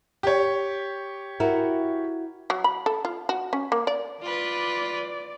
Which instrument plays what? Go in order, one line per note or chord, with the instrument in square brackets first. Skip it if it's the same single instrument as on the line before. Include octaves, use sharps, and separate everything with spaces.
[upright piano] G4 C#5
[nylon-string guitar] E4 F#4 A#4
[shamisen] F#3
B5
A4
F4
F#4
C#4
A#3
D5
[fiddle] F4 B4 [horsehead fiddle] D5